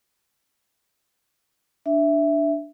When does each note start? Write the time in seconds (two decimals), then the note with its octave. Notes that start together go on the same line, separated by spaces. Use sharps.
1.86 D4 E5